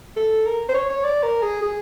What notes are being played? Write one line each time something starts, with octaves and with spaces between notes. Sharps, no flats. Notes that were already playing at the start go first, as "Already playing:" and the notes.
A4
A#4
C5
C#5
C#5
D5
A#4
G#4
G#4